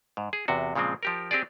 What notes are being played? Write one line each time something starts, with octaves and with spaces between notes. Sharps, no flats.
G#2
G#4
E2 C3 F#4
A#2 C#3 F3 G#3 C4
F3 G4 A#4
C4 G4 G#4 D5